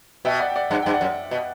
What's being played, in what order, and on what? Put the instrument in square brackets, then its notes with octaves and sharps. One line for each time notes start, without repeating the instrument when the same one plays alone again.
[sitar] B2 [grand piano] E5 G5
[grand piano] D5 F#5
G5
D5 F#5
[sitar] G2 [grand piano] F#5
[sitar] G2 [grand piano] G5
[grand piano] D5 F#5
[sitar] F#2
B2